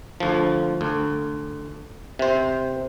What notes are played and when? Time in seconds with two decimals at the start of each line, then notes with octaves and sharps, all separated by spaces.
0.20 D2 F3
0.81 D2
2.19 C3 C5